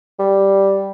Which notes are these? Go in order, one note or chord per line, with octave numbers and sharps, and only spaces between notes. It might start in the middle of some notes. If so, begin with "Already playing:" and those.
G3